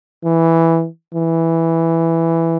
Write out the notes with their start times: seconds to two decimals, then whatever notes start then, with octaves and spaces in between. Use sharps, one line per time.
0.24 E3
1.14 E3